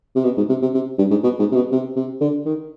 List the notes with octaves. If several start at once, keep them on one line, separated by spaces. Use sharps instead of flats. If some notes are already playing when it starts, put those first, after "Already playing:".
C3
B2
G#2
C3
C3
C3
G2
G#2
B2
G#2
C3
B2
C3
C3
D3
D#3